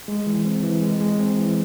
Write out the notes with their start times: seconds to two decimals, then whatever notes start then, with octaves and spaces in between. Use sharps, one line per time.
0.08 G#3
0.27 E3
0.45 C4
0.63 E3
0.82 G#3
1.01 G#3
1.19 C4
1.39 E3